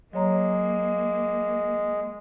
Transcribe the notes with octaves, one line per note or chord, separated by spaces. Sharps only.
F#3 G#3 A#3 C#5 A#5